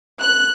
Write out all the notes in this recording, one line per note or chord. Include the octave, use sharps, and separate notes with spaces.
F#6